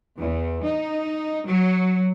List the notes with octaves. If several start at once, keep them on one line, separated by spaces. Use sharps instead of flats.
E2
D#4
F#3